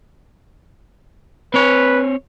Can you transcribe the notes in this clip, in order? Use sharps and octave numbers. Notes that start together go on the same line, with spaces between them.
C4 B4 C#5